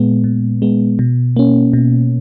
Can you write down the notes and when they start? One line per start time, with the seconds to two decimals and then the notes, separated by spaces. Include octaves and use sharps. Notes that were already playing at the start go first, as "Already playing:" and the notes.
Already playing: A#2 G#3 B3
0.24 A#2
0.62 G#3 B3
0.99 B2
1.37 A#3 C#4
1.73 B2